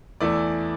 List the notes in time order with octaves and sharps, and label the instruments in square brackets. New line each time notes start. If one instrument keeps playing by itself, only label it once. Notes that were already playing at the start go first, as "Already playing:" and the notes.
[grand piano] E2 E3 A3 E4 D5